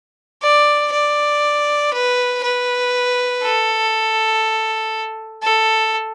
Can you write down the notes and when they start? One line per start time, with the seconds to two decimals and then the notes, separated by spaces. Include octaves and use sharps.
0.42 D5
0.92 D5
1.93 B4
2.43 B4
3.43 A4
5.43 A4